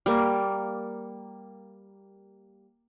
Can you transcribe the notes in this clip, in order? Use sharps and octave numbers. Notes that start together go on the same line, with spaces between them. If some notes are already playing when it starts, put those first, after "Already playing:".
G3 A#3